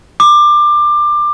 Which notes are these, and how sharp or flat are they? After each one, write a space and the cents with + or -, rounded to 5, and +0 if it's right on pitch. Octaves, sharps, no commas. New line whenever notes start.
D6 +20